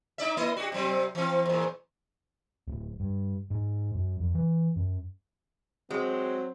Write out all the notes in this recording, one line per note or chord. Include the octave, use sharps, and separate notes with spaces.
D#4 D5 E5
A#3 E4 D#5
F#4 G4
C3 F#3 C4
E3 C4
E2 A#2
D1
G2
G#2
F#2
F2
E3
F#2
F#3 G#3 C4